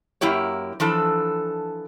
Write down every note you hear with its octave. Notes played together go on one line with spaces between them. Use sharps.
F#2 A#3 E4 G4 C#5
E3 F3 D4 A4